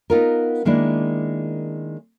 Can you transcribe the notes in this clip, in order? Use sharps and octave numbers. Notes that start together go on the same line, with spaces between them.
B3 D#4 F4 A#4
D#3 G#3 A#3 D4 E4